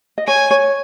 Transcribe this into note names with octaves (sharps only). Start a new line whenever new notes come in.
D#5
C#5 G#5
C#5